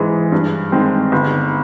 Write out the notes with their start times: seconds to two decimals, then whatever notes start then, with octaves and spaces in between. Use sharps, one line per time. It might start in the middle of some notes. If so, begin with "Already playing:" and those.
Already playing: G#2 E3 G#3
0.32 G2
0.72 D#3 G#3 C4
1.12 G1